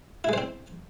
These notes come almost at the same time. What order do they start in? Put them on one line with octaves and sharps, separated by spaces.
E4 G#3 C5 C4